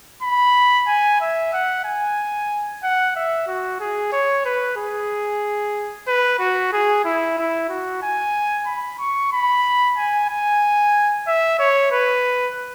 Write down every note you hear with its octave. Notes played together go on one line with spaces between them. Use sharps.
B5
G#5
E5
F#5
G#5
F#5
E5
F#4
G#4
C#5
B4
G#4
B4
F#4
G#4
E4
E4
F#4
G#5
B5
C#6
B5
G#5
G#5
E5
C#5
B4